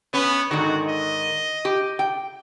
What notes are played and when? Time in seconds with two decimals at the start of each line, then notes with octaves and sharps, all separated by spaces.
0.14 B3 C#4
0.51 G#2 D3 D#3 F#4
0.88 D#5
1.65 G4
1.99 G5